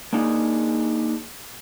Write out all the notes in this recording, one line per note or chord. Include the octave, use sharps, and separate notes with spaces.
A#3 D4 D#4 G#4